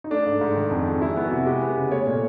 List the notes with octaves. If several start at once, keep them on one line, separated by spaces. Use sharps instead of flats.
D#4
A3 D4
G#2
G#2
D#3
F2
F2
G#3 E4
B3
F#4
C3
G#3 G4
B3
C#3
A3 C#5
A#2